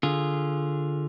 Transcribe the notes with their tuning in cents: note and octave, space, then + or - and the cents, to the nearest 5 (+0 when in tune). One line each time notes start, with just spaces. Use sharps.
D3 +5 F4 +0 G#4 +0